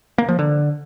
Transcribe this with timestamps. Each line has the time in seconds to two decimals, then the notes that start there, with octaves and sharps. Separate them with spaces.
0.18 A#3
0.29 F3
0.39 D3